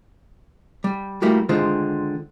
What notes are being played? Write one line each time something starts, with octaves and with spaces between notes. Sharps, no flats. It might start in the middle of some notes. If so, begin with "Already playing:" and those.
G3
G3 A3 A#3 E4 F#4 G4
D3 D#3 G#3 F4 C5